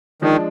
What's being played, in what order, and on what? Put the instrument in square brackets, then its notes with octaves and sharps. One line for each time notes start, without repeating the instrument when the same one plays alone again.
[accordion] D#3 [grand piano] F3 G#3 D4